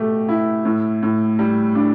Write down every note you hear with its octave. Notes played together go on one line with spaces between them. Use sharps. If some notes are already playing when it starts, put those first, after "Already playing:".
Already playing: B2 A3 G4
E4
A2
A2
G3
D4